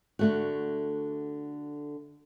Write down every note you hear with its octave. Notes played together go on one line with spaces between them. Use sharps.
D3 A3 F#4